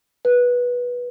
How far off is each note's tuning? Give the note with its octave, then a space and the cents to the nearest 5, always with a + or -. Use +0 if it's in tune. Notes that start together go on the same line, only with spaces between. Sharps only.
B4 -15